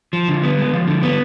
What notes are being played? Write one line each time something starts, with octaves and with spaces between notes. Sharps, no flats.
F3
D3
B3
G#3
F3
D3
B3